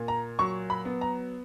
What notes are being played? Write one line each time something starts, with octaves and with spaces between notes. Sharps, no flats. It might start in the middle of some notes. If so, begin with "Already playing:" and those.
Already playing: A#2
A#5
F#3 C#6
B5
B3
A#5